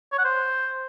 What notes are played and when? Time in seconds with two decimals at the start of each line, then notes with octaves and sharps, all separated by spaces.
0.12 C#5
0.18 F#5
0.25 C5